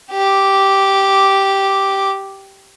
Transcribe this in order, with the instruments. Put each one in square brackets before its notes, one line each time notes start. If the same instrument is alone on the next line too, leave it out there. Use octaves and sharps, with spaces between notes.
[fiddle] G4 D6